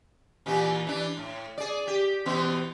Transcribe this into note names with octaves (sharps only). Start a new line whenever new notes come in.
A#2 E3 G4
E3 D4
A2
G#4 D5
G4
B2 E3 B3